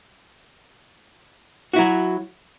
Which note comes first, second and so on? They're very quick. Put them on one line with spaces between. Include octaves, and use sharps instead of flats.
F#4 E4 F#3